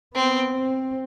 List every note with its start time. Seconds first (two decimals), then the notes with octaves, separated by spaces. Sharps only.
0.14 B3 C4
0.54 C4